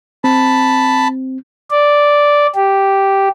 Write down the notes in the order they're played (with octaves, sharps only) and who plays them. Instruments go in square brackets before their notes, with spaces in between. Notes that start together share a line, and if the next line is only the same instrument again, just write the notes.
[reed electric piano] C4 [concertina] A5 B5
[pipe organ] D5
G4